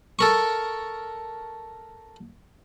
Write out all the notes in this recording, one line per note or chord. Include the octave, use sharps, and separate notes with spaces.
A4 A#4 C#6